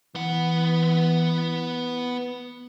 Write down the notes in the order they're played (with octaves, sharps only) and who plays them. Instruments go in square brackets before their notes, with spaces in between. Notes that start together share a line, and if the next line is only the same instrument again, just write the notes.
[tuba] E3 [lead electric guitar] B3 F#5